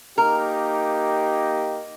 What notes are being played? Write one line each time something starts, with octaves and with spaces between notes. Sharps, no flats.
A#3 D#4 G4 A#4